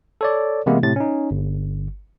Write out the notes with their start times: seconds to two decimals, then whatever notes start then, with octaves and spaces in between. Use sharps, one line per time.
0.21 A4 C#5 D5
0.66 C3 E3 G#3 A#3 B3 E4
0.83 A2 C3 A6
0.96 C#4 D#4
1.31 G1